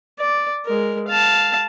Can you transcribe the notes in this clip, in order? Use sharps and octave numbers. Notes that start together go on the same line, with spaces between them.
D5
G#3 A#4
F5 A5